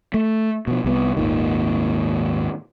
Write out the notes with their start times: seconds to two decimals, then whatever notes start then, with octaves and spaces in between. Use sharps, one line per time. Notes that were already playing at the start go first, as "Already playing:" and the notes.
0.14 A3
0.67 B2 F3
0.84 C2 G#3 B3
1.17 G#1 D#2 A#2 D#3